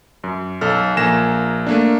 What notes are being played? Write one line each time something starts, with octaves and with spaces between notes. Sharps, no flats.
F#2
B1 A4 F6
A#1 A#3 G#5 A#6 E7
A3 A#3 D4